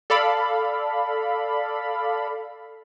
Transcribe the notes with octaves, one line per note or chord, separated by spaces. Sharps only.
A4 D5 F5 B5